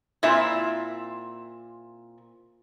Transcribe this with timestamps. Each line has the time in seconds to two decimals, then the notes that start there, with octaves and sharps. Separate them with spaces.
0.23 A#2 C4 E4 E5